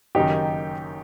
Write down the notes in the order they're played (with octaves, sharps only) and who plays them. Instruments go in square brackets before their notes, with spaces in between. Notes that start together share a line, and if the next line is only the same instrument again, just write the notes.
[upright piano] F#1 F#2 D#3 D#4 G4